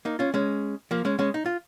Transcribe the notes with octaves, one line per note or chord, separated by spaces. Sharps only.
A#3 D#4
C#4 F4
G#3 C#4
F3 A#3
G#3 C#4
G#3 C#4
D#4
F4